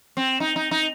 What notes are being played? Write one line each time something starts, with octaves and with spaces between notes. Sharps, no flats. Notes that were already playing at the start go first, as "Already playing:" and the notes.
C4
D#4
D#4
D#4